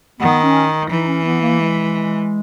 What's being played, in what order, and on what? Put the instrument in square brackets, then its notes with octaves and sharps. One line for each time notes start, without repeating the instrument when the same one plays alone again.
[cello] D#3 [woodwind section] B3
[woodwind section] C#4
[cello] E3 [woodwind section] D#4
[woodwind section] C#4
B3
A#3
G#3